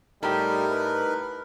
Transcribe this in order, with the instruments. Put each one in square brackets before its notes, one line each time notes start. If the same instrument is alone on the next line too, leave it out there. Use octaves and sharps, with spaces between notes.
[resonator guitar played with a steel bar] A2 E4 G4 [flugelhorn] G3 [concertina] D#4 A#4
[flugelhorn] B4